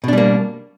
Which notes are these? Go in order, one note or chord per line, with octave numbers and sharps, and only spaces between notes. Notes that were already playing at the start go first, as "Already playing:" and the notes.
B2 G3 A#3 D4